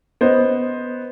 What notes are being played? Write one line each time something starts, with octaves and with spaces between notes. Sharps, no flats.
B3 C5 D#5